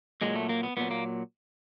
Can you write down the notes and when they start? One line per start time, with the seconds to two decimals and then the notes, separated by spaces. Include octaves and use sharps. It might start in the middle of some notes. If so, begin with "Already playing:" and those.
0.22 A#2 F#3 G#3
0.35 A3
0.49 A#3
0.63 B3
0.77 A#2 F#3 B3
0.91 A#3